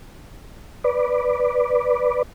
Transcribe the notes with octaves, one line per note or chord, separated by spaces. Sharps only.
B4 D5